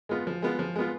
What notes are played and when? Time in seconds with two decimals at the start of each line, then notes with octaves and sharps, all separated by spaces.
0.09 G#3 B3 F4
0.27 F3
0.42 G#3 B3 F4
0.59 F3
0.76 G#3 B3 F4